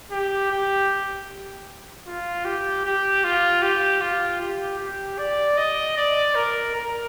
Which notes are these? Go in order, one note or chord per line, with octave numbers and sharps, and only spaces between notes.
G4
G4
F4
G4
G4
F4
G4
F4
G4
G4
D5
D#5
D5
A#4
A#4